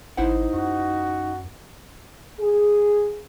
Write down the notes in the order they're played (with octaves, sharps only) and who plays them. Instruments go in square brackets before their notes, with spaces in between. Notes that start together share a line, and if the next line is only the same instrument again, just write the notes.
[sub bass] G#1 [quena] D#4 [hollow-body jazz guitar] E4 C5 F#5
[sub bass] F#2 [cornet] F#4
[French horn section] G#4